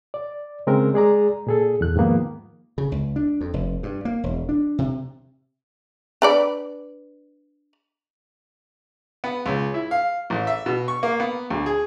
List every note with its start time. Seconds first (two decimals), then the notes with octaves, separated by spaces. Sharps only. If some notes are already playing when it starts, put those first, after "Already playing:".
0.14 D5
0.67 C#3 G#3 C4 C#4 A#4
0.94 G#3 G#4 D5 A#5
1.47 A#2 G#4 A4
1.81 E2 F#6
1.96 G#2 D#3 F3 A#3 B3
2.78 C#3
2.92 C#2
3.16 D4
3.41 F2
3.54 F1
3.83 G2
4.05 A#3
4.24 E1
4.49 D4
4.78 C3
6.22 D4 B4 D5
9.24 B3
9.46 C#2
9.74 E4
9.91 F5
10.30 A1
10.47 E5
10.66 B2
10.88 C#6
11.03 A#3
11.20 B3
11.50 D2
11.66 G#4